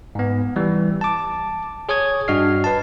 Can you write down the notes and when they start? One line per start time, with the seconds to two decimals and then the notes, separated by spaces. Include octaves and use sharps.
0.15 G#2 B3
0.56 E3 G3
1.01 A5 D6
1.89 G#4 C#5 C#6 D#6 G#6
2.28 G2 D4 F#4 D#5 F6 C7
2.64 B4 A5